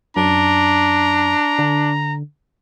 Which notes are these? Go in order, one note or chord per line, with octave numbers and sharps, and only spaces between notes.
F#2 D4 A#5
D3